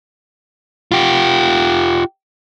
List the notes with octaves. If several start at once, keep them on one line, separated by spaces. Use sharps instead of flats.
F4 G4